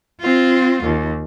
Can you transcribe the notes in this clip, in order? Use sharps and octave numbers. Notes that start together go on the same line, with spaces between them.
C4 F4
D#2